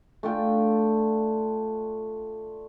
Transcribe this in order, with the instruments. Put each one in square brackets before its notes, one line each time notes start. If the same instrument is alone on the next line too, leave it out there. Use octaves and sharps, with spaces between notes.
[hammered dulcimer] A3 D4 F4 G5